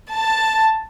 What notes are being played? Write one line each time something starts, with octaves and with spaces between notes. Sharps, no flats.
A5